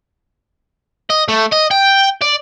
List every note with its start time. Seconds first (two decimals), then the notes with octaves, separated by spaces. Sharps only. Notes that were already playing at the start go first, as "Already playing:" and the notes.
1.10 D#5
1.29 A3
1.53 D#5
1.71 G5
2.21 D5